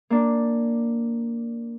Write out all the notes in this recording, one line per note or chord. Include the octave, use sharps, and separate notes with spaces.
A#3 D4